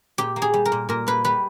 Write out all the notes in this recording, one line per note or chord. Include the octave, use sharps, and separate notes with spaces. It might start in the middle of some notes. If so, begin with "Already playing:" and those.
A#2 G4
A#3
G#4
G3
A#4
A#2
A#2 A#4
A#3 B4
G3 B4